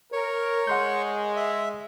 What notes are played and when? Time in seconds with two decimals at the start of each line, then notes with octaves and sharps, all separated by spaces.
0.13 A#4 C#5
0.67 G#3 F#5 C6 G6
1.37 E5